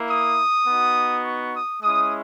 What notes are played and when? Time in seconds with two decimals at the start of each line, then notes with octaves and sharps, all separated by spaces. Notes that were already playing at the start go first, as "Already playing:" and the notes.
Already playing: A#3 E4
0.09 D#6
0.67 B3 D#4 F#4
1.24 C#6
1.54 D#6
1.83 G#3 C#4 E4 D#6